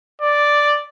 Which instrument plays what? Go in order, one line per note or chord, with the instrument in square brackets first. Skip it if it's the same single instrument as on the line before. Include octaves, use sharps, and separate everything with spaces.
[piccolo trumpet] D5